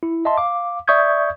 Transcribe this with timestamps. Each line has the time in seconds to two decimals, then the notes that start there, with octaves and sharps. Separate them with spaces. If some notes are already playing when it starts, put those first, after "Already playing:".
0.03 E4
0.25 D#5 E5 A5 C6
0.38 F5 D6
0.88 D5 E5 C#6 D#6 G6 G#6